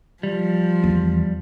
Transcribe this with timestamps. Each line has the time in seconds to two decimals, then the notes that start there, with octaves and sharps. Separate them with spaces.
0.23 F3 G3
0.84 E2